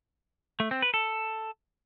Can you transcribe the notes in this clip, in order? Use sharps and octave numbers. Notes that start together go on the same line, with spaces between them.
A3
C4
B4
A4